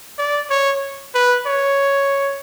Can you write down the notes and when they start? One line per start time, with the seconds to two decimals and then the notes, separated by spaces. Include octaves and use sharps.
0.19 D5
0.51 C#5
1.15 B4
1.47 C#5